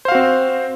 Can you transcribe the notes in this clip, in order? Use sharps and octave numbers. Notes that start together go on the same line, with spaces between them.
C4 F#4 C5 F5